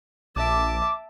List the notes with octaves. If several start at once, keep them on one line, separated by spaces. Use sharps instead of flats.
A#1 E5 A5 D6